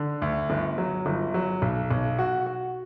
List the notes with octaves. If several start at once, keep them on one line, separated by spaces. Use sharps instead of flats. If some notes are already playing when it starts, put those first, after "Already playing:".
Already playing: D3
D2
G1
F#3
G1
F#3
B1
B1
F#4
F#4